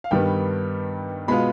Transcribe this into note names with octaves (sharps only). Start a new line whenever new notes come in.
F5
G2 D#3 G3 B3 G5
B2 G#3 B3 F4 B5